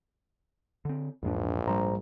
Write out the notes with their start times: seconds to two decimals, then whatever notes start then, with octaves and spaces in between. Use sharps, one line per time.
0.85 D3 C4
1.23 A#1 E2 G#2 D4
1.67 G#2 G3 C5 A#5